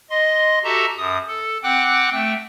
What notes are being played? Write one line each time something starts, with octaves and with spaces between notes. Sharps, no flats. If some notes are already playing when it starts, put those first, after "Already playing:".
D#5 C6
F#4 G4 A4 E5 A5 A#5
F#2 D#6
A4
C4 F#5 G5 D6 F#6
A3 G5